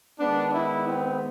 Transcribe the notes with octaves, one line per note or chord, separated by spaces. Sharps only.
D#3 G#3 B3 D4
E4
C4